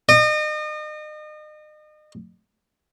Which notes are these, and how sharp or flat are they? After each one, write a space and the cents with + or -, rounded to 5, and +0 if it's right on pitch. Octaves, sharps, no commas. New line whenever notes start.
D#5 -35